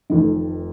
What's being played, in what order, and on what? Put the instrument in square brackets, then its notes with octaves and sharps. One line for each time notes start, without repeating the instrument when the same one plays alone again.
[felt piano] F1 F2 D#3